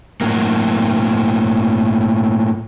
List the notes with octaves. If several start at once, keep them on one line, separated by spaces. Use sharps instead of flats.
A2 F#3 A#3